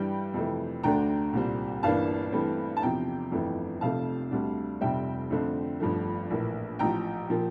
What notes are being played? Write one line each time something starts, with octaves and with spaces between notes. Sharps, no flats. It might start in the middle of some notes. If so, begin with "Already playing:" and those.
Already playing: G2 E3 G3 G5
F2 C3 E3 A3
D2 D3 A3 D4 G5 A#5
C2 A#2 G3 C4
G1 G2 E3 A#3 D4 F5 A5
G2 E3 A3 C4
A5
E2 C3 F3 G5 A#5
G1 F2 E3 A3
F1 F2 C3 F3 A3 F5 A5
D2 C3 G3 D4
F1 F2 C3 G3 C4 E5 G5
F2 D3 A3 C4
G1 G2 F3 A3
A#1 A2 E3 A#3
A1 A2 F3 G5 A#5
A#2 F3 A#3